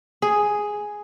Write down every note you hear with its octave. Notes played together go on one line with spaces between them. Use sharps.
G#4